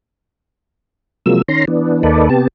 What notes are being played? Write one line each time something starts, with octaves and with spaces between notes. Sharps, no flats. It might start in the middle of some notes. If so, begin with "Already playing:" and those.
C3 F3 F#3 G#3 A#3 E6
D#3 C#4 A#5 C6
E3 B3 D4
D#2 A#3 D#4 A4 B4 D5
C3 B3 G4 A5